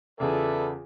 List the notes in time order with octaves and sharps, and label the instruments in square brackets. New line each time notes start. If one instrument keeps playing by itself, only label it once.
[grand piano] E2 C#3 [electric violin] F4 G#4 [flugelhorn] A4 [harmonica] B4 D5 E5